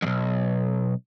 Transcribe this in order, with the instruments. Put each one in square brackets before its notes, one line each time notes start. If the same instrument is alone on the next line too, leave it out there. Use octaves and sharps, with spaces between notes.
[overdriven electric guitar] B1 F2